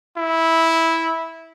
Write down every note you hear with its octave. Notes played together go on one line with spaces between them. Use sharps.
E4